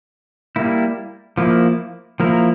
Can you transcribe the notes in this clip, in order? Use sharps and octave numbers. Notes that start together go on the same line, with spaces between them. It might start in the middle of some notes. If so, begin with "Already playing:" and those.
G3 A#3 E4
F3 A#3 E4
F3 A#3 E4 A#4